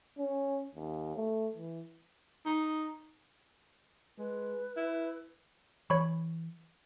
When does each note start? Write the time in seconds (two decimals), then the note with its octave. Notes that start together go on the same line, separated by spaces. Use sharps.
0.18 C#4
0.75 D#2
1.16 A3
1.55 E3
2.45 D#4
4.18 G#3 B4
4.77 E4
5.90 E3 C#5 B5 C#6